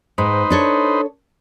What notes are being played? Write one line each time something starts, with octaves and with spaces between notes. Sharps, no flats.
G#2 D#4 B4 C5
D4 A4 C#5